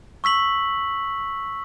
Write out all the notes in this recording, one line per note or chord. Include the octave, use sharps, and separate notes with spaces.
C#6 E6 B6 F#7